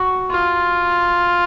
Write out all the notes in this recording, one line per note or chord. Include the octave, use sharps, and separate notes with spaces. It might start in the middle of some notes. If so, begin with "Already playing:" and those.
Already playing: F#4
F4